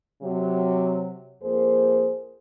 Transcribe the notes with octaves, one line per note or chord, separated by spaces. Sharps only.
C3 F#3
F2 A#3 G#4 C5